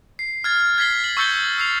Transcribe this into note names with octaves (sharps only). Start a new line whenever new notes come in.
C7
F6 G#6 A6
G#6 A6 B6 C7 G7
F#7
C#6 E6 G6 A6 C#7 G7
E6 C7 F7